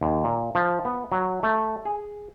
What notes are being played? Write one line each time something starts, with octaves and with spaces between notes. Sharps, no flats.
D#2
A#2
F3
B3
F#3
A3
G#4